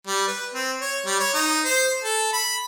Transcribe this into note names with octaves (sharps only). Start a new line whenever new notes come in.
G3
B4
C4
C#5
G3
C#5
D#4
C5
A4
B5